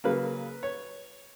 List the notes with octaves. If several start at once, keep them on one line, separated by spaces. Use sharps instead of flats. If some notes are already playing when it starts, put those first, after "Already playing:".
C#3 F#3 A#3 B4
C#5